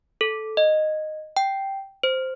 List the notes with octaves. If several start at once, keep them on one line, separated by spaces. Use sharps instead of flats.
A4
D#5
G5
C5